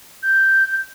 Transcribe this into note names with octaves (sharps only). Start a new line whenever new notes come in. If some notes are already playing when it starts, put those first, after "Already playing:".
G6